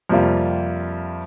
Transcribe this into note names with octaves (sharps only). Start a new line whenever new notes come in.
F2 C3 G3 A#3 F4